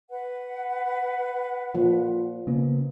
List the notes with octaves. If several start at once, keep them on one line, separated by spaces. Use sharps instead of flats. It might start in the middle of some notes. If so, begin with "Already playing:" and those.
B4 F#5
A#2 F3
C#3 A#3 B3